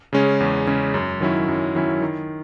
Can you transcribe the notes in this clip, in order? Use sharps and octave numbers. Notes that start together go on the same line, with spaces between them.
C#3 G#3 C#4
E2
C#3 G#3 C#4
F#2
D#3 F#3 C#4 E4
F#2
D#3 F#3 C#4 E4
D#3